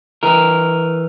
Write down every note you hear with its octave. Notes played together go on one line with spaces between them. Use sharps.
E3 A#4